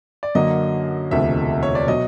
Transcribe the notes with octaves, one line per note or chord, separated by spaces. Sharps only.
D5
F#2 D3 F#3 A#3 D#5
E1 D2 C3 F3 A3 E5
C#5
D5
B2 F#3 D#5